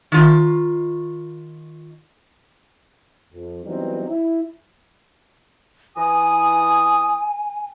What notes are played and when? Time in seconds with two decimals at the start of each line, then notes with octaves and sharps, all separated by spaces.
0.12 D#3 F4
3.33 F2
3.65 E3 F#3 G3 B3 C4 D#4
4.08 E4
5.96 E3 G#5 D#6